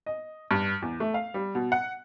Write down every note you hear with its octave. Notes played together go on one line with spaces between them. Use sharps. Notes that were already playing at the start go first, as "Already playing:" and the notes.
D#5
G2
E2
A3
F5
G3
B2
F#5